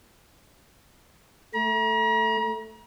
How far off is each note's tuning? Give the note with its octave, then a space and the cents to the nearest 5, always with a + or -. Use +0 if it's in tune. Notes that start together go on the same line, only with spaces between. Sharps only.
A3 +0 A#5 +40